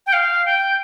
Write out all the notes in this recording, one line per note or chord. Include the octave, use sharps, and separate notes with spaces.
G5
F5
G5